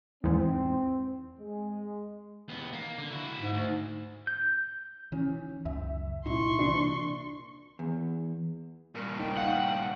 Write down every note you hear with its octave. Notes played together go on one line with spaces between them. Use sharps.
E2 G#2 C4
G#3
D#2 B3
A#3
D3
E4 F#4
G#2
D2
G6
D#3 E3 C#4
C#2 F#2 E5
C2 A#2 D#4 E4 C6 C#6
C3 E3 A#3 D4
E2
G2 A#2 A#4
D#4 G5
F5 F#5